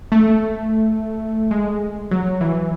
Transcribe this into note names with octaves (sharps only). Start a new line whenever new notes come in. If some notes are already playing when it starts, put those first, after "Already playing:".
A3
G#3
F#3
E3